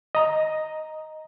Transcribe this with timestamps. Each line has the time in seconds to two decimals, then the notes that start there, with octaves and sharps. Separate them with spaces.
0.15 D#5 A#5